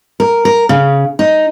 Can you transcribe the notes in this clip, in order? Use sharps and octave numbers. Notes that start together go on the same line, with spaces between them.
A#4
A#4
C#3
D#4